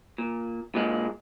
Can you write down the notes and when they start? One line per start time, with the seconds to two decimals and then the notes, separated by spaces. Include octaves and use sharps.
0.18 A#2
0.75 A#2 G#3